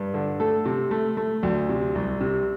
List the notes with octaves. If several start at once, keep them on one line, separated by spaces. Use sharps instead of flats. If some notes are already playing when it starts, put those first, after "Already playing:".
Already playing: G2
D3
A3 A4
C3
A3
A3
D2
C3
C2
C3